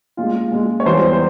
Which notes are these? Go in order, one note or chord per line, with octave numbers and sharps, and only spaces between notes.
A#2 G#3 F4
A#2 G#3
C#5
E2 E3 G3 C5
C5